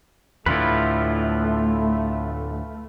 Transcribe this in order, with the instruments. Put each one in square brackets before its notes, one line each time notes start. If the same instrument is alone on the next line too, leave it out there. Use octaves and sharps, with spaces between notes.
[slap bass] D2 A2 [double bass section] A3 [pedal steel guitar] E4 F4 B4